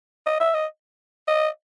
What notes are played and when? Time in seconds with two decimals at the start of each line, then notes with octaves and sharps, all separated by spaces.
0.26 D#5
0.40 E5
0.54 D#5
1.28 D#5